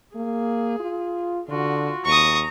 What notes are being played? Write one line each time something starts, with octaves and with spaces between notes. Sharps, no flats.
A#3 G#4
F4
D3 F4 F#4
D#2 A#5 C#6 D#6